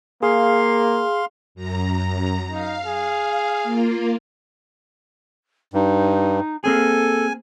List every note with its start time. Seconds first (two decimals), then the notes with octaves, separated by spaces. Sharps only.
0.23 A#3 G#4 F5 C6
1.55 F#2 A#5
2.51 D#4 F5
2.86 G#4
3.63 A#3 F4
5.74 G2 D#4
6.64 A#3 C4 G#4 A4 G#5